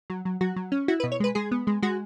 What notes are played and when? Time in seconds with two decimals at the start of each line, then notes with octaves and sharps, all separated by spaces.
0.10 F#3
0.25 F#3
0.41 F#3 F#4
0.56 F#3
0.72 C#4
0.88 E4 F#4
1.00 B4
1.04 B2
1.12 C#5
1.20 G#3 B4
1.35 G#3 G#4
1.51 B3
1.67 G#3
1.83 G#3 F#4